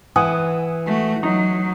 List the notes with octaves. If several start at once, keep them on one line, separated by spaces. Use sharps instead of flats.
E3 F#5 G#5 D#6
A3 F#4
F#3 D#4